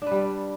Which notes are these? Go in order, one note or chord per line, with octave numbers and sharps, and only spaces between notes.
G3 D4 B4